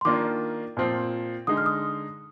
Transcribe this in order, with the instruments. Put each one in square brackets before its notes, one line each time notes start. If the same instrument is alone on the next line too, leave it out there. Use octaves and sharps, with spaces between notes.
[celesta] C6
[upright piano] D#3 A#3 D4 F4 [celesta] D6
[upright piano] A#2 F3 C4
[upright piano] D3 G#3 D#4 [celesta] D#6
[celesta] F6
D#6